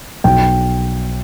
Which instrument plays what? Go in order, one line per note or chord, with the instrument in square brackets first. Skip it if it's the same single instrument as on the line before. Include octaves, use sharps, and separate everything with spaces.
[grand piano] B1 G5